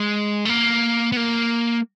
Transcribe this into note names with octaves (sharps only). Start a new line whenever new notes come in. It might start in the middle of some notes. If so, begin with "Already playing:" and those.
Already playing: G#3
A3
A#3
B3
A#3